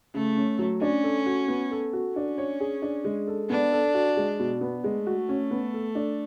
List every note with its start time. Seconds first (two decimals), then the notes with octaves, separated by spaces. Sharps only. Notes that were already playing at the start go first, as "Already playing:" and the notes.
0.14 C#3 A3
0.37 C#4
0.59 F#3
0.81 C#4 D4
1.04 A4
1.26 F#4
1.48 B3
1.71 A4
1.93 F#4
2.16 C#4 D4
2.38 C#5
2.60 G#4
2.82 D4
3.05 G#3
3.27 A4
3.50 B3 D4
3.72 A4
3.94 F#4
4.17 G#3
4.39 B2
4.61 B3
4.84 G#3 A3
5.07 F#4
5.29 C#4
5.51 B3
5.74 A4
5.95 D4